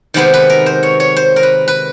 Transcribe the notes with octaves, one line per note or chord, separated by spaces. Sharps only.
C3 D#3 G#3 B3 C5
B4
A#4
C5
C#5
C#5
C5
A#4
B4
B4